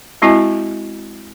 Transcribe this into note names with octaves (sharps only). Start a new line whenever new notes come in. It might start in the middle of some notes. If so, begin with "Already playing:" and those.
G#3 C4 E4 F#4 D#5 G#5